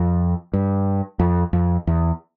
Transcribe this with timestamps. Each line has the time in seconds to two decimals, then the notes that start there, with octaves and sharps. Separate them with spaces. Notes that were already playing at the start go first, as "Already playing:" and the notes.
Already playing: F2
0.53 G2
1.19 F2
1.53 F2
1.87 E2